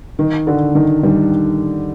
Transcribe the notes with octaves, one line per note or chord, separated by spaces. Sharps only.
D#3
D3
D#3
D#3 G3